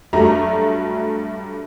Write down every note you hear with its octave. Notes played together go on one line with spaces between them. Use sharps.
G2 F#3 G3 A3 A#5